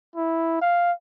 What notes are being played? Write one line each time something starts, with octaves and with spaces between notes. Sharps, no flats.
E4
F5